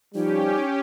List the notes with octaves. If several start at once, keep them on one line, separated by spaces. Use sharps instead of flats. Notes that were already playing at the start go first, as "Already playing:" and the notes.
F3 G3 C#4 D#4 G4